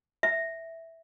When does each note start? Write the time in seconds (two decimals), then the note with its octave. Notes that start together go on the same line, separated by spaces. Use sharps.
0.23 E5